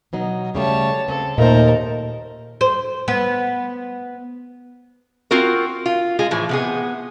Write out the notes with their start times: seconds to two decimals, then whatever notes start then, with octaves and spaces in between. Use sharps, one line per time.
0.13 B2 F#3 D#4
0.55 C#3 G3 A3 C#5 A5
1.08 C#3 C4 A4
1.38 D#2 A#2 A3 A4 A#4 C5 D#5
2.61 C5
3.08 B3
5.31 C4 F4 F#4 A#4
5.86 F4
6.19 G#3 F4 G#4
6.31 A2 E3 F3
6.49 C3 B3 G#4